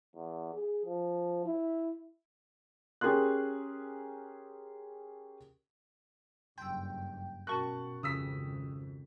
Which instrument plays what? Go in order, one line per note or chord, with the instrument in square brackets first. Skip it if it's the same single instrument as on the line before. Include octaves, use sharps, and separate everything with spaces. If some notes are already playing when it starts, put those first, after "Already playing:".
[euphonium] E2
G#4
F3
E4
[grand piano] C#4 G4 G#4 A#4 C6 F#6
[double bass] F#1 G2 [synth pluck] G5 [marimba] C6 E6
[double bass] B2 [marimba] C#4 F#4 A#4 [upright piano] A5 C#6 F#6
[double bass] G#1 F2 [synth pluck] C#3 [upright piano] D#6 E6 B6